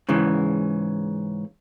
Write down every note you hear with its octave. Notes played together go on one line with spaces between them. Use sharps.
G#2 C#3 E3